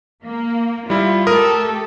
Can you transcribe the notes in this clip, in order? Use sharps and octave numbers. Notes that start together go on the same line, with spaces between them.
A#3
G3 E4 F4
A3 G4 A4 A#4 D#6